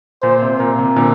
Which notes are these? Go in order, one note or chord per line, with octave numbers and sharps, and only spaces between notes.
A#2 C5
C3
A#2 A#4
C3
A#2 D3